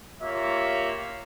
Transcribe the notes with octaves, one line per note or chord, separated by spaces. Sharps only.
A#3 F4 G4 C#5 E5 F5